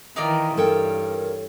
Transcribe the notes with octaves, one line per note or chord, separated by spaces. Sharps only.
D#3 E3 D#4 F4 D5
G2 A4 A#4 C#5 G5